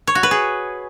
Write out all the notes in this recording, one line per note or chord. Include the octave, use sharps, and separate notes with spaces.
C#5
F#4
B4
G#4